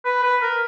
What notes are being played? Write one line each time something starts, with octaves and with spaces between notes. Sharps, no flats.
B4
B4
A#4